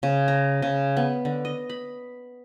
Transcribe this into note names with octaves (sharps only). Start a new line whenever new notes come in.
C#3
A#5
C#3
B3
D3
D#5
B5